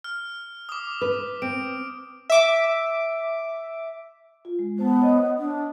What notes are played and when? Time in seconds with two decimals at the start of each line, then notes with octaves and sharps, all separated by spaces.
0.04 F6
0.69 D6 D#6
1.01 B4
1.42 C4 D7
2.30 E5 D6
4.45 F4
4.59 G#3
4.79 B3 C5 A5
5.00 C#5 D#5
5.38 D4 D#6